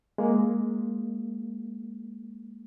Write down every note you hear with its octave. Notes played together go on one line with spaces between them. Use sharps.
G#3 A#3